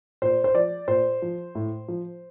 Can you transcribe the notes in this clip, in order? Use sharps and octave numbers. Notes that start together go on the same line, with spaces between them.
A#2 C5
C5
F3 D5
A#2 C5
F3
A2
F3